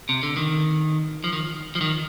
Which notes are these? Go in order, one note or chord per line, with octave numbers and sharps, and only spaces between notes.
C3
D3
D#3
F3
D#3
F3
D#3